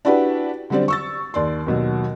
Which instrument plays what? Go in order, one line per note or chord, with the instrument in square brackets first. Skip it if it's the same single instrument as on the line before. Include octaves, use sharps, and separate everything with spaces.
[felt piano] D4 E4 F#4 G4 B4
D3 F#3 G3 C4 D5
C#6 E6 A6
D#2 D5 C6
D#2 B2 F#3